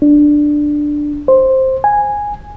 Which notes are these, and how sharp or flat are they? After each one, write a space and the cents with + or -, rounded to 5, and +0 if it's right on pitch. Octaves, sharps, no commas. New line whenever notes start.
D4 +5
C5 +10
G#5 -10